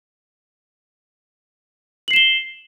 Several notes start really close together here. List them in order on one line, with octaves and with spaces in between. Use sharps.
F#7 C7 E7 G7